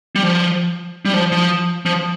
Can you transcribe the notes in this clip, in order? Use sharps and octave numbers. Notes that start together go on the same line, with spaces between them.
G3
F3
G3
F3
F3
F3